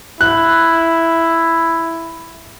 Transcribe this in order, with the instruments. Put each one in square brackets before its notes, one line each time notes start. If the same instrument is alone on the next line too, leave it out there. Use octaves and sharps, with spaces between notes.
[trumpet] E4 [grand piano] F#6